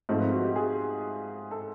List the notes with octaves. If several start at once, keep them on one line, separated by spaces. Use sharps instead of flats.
G#2 F3 A3 C4
B4
F#4
G4
G#4
A4